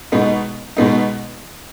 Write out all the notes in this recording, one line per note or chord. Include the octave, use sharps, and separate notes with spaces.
B2 G#3 B3 D#4
B2 G#3 B3 D#4